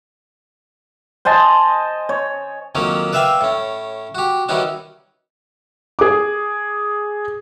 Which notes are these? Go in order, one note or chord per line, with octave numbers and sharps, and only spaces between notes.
C5 D#5 G#5 A5
C#5
F2 D#3 F#3 A#3 C#4
B4 D5 E5 F5 G5 G#5
A2 C#4
F#4 G4
D#3 E3 G3 C#4 D#4 F#4
G#4 D6